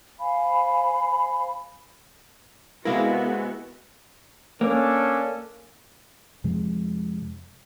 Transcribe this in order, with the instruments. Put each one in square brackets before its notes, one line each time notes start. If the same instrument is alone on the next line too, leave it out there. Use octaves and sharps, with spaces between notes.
[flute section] C5 F5 G#5 B5
[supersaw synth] C3 G#3 E4 [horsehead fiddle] B3 F#4 [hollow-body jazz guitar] A#4 F5
[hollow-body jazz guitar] A#3 [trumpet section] C#4 D4 A4
[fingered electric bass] F2 C3 F3 G#3